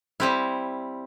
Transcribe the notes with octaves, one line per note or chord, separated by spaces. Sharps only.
G3 C4 E4